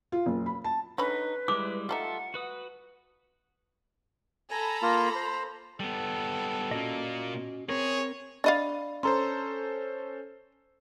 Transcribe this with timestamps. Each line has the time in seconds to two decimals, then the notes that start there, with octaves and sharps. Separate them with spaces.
0.12 F4
0.26 F#1
0.46 B5
0.64 A5
0.98 D3 C#4 D#4 B4 B5
1.48 G3 G#3 E4 D6
1.89 G3 A3 D#4 F4 A4 E5 F#5
2.34 F#4 B4 D#6
4.50 A4 G#5 A#5 B5
4.82 A#3 F4
5.15 C5
5.80 G3 B3 A4
6.71 A#2 A#3 C#4 F#4 D#5
7.69 C4 G#4 A#4 C#5
8.44 D4 D5 D#5 F5 B5 A6
9.03 C#4 A4 C5 A#5 C6